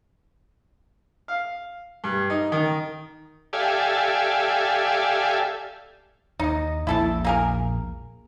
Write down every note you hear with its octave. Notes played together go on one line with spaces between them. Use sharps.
F5
G2
D#4
D#3
G4 A4 D5 E5 F5 G#5
D#2 D#4 D#5
A#1 E2 A#2 E4 A4 A5
A#3 G#4 A#4